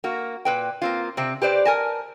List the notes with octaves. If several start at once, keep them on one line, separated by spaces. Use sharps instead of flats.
A#3 F#4
A#2 B4 G5
A#3 C4 F4
C3 C4
G4 B4 C5 D5
A#4 G#5 A5